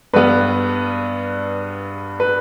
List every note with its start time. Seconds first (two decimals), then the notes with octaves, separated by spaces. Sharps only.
0.13 G2 G3 B3 B4
2.20 B4